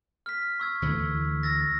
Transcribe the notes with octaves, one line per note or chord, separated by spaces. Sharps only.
F6 B6
C#6 E6 G#6
D2 E3 A3
E6 A6 A#6